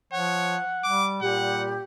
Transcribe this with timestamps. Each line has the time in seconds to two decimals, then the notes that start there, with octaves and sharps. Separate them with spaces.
0.13 F3 C#5 F#5
0.84 G3 D6
1.22 A#2 G3 G4 F#5